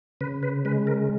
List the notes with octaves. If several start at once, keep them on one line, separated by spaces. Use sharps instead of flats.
C#3 B4
B4
G#3 B4
A#4